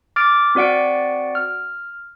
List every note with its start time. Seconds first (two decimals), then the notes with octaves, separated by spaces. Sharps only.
0.16 D6 F6 A6 D7
0.55 C4 F#4 D5 F#5 D7
1.35 F6